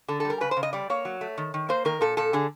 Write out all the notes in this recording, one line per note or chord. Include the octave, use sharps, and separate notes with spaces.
D3 A4
G3 A4
A#4
C#3 B4
C5
C#3
D#5
G3 D5
A#3 C#5
F#3
A3
D#3
D#3
A#3 C5
D#3 A#4
A#2 A4
A#2 A4
D3 G#4